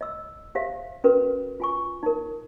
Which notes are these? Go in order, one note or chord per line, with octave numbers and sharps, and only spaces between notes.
D#5 E6
G4 C5 E5 F5
C#4 F#4 A#4 B4
F4 G#5 C#6
D#4 A#4